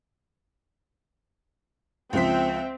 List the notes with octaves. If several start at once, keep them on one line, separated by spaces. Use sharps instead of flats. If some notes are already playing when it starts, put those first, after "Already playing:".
C#2 F3 C4 E5 G5 B6